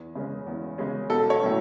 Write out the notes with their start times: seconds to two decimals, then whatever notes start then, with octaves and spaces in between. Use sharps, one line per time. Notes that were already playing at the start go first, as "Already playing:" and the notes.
Already playing: E2
0.15 C#3 G#3 C#4
0.47 E2
0.78 C#3 G#3 C#4
1.10 B1 A4
1.30 C#5
1.41 A2 F#3 C#4